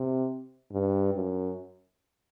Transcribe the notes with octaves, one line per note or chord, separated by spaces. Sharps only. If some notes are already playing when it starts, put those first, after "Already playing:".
Already playing: C3
G2
F#2